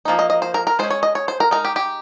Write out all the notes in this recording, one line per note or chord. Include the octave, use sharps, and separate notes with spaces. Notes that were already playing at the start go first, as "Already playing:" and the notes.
F3 A#3 D#4
D#5
D#5
C5
A#4
A#4
G#3 C#4 C5
C#5
D#5
C#5
C5
A#4
G#3 D#4 A#4
G4
G4